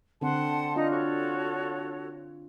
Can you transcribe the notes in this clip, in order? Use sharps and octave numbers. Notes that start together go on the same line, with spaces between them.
D3 C4 F#5 A5 C6
D4 D#4 F4
F#4 A4 C#5